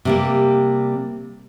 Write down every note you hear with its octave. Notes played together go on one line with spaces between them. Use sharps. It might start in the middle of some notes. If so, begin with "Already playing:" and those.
C3 G3 A#3